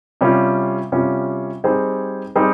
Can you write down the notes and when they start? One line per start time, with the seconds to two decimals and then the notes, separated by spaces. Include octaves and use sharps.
0.21 C3 G3 C#4 F4
0.92 C3 G3 C#4 F4
1.64 G3 C4 D#4 G#4 C5
2.35 G3 C4 D#4 G#4 C5